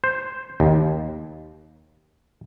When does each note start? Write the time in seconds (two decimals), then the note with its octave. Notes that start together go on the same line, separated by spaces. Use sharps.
0.04 C5
0.60 D#2